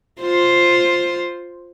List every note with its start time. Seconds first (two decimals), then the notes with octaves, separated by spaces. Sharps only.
0.21 F4 C5